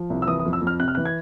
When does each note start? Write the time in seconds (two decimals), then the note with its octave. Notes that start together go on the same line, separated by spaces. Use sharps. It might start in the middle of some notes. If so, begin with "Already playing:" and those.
Already playing: F3
0.10 C2
0.22 E6
0.27 E3 D#6
0.39 D#6
0.45 F2
0.53 E6
0.61 F2
0.67 F6
0.80 C3 F#6
0.88 F6
0.95 E3 F#6
1.05 G#6